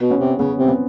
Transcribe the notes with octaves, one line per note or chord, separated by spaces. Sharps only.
B2
B3 C#4
C3
C#3 B3 C#4
C3 C4
B3 C#4